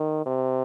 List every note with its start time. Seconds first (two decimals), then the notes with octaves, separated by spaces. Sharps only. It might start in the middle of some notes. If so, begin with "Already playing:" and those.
Already playing: D#3
0.26 C3